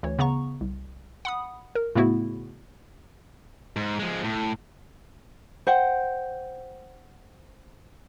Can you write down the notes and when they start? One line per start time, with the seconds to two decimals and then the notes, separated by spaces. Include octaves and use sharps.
0.03 D2 E3 C#5
0.19 C#3 B3 A#5 C#6
0.61 C2
1.25 F#5 B5 D#6
1.75 A#4
1.95 A2 C#3 A3 B3 E4 F#4
3.76 G#2
3.99 F3 G#3
4.24 A2
5.67 C5 F#5 G5